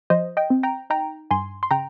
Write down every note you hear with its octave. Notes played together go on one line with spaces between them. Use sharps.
F3 C5 D#5
D#5 G5
C4
G5 A#5
D#4 G5 A#5
G2 G#5 C6
C6
C#3 G5 A#5